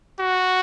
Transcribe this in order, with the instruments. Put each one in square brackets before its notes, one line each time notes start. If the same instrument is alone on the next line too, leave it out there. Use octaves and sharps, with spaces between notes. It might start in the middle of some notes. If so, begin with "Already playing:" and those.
[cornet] F#4